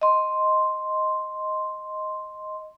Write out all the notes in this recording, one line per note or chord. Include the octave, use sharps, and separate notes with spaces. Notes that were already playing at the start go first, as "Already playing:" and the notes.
D#5 C6